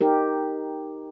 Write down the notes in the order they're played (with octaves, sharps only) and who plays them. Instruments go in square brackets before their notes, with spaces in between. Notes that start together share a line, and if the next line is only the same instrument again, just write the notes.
[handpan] D#4 G4 A#4